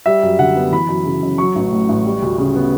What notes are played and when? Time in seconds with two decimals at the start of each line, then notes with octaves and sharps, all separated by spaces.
0.06 G3 E5
0.23 F#2
0.39 D3 F#5
0.56 B3
0.72 E3 B5
0.88 F#2
1.05 C#3
1.23 F#2
1.38 F#3 C#6
1.56 A1
1.72 A2
1.89 A1
2.05 G3
2.22 D2
2.38 C#3
2.56 B3